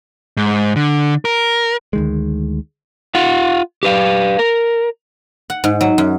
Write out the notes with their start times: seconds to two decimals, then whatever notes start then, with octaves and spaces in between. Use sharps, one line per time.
0.37 G#2
0.76 D3
1.25 A#4
1.93 D2 D#3 G#3
3.15 F4 F5 F#5
3.83 G4 B4 F5
4.39 A#4
5.50 F#5
5.64 G#2
5.81 F#3
5.98 F#2